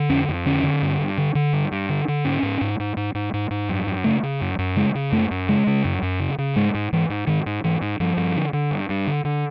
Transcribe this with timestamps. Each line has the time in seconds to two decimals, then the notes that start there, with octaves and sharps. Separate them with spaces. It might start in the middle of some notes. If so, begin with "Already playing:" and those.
Already playing: D3
0.09 F2 C#4
0.29 F2
0.46 D3 C#4
0.63 D3
0.82 G2
1.00 G2
1.18 D3
1.35 D3
1.53 G2
1.72 G2
1.89 D3
2.08 D3
2.25 G#2 C#4
2.43 G#2
2.61 G#2
2.79 G#2
2.97 G#2
3.15 G#2
3.33 G#2
3.50 G#2
3.69 F#2
3.87 F#2
4.04 C#3 A3
4.23 C#3
4.41 F#2
4.58 F#2
4.76 C#3 G#3
4.95 C#3
5.12 F#2 A3
5.31 F#2
5.48 C#3 G#3
5.67 C#3
5.85 F#2
6.02 F#2
6.20 C#3
6.38 C#3
6.56 G#2 G#3
6.74 G#2
6.92 G#2 E3
7.09 G#2
7.27 G#2 D#3
7.46 G#2
7.64 G#2 E3
7.82 G#2
8.00 G2 F3
8.17 G2
8.36 D3
8.53 D3
8.71 G2
8.89 G2
9.07 D3
9.25 D3